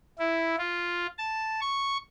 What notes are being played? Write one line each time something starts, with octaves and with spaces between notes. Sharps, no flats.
E4
F4
A5
C#6